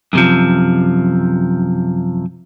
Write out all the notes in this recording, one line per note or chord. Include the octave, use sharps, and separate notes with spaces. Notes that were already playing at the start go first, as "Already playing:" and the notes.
F#2 C3 F3